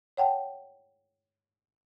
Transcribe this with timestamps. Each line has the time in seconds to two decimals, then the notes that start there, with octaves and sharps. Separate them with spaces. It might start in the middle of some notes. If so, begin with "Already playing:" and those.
0.17 C#5 F#5 G5 A5